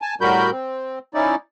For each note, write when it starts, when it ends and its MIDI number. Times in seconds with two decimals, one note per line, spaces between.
0.02 0.15 80
0.02 0.15 81
0.21 0.51 45
0.21 0.51 55
0.21 0.51 66
0.21 0.51 70
0.21 0.51 83
0.21 0.51 91
0.51 0.99 60
1.14 1.36 61
1.14 1.36 63
1.14 1.36 64
1.14 1.36 74